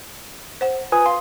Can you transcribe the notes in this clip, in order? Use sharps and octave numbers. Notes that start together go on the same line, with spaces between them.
C5 F#5
F4 B4 G#5 D#6
F5 C6